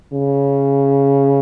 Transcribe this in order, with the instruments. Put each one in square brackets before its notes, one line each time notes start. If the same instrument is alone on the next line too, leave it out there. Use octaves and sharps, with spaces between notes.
[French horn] C#3